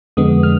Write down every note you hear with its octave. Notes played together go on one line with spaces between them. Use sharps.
F2 D3 G#3 B3 D#6
F6